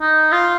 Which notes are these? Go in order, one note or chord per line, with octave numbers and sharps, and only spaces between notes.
D#4
F4